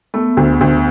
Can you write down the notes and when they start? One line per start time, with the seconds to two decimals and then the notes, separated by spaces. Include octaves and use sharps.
0.14 A3 B3
0.37 D2
0.61 D2